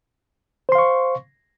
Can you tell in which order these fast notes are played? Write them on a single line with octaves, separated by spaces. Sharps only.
C5 C6 F5 C#6